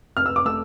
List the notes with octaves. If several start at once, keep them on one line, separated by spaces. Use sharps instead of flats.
F1 F6
E6
D6
A3 E6